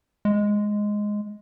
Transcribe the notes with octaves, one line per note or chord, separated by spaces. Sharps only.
G#3